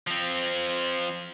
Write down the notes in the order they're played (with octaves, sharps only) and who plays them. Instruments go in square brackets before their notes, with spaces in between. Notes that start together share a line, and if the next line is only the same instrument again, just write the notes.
[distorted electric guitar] F3 C4